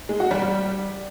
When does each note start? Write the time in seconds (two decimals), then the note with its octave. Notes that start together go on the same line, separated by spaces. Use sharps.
0.09 G#3
0.20 F#4
0.31 G3
0.42 G3